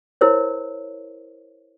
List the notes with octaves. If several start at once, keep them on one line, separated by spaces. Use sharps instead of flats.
E4 A#4 C5 C#5